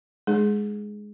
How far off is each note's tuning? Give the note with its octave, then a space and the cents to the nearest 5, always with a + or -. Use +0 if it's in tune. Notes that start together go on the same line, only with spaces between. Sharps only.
G#3 +0 D#4 -40 G#4 +10